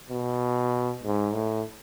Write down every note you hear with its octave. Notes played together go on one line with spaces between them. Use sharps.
B2
G#2
A2